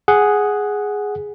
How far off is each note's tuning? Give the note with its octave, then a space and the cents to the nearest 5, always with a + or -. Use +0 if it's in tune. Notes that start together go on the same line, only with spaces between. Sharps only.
G#4 +0 F#5 +0